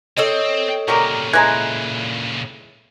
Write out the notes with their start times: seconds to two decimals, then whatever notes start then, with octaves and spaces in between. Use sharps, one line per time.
0.17 C4 A4 C#5 D#5
0.88 A#2 C#3 F#3 G3 A#4
1.33 E3 G#3 A#5 F#6 G#6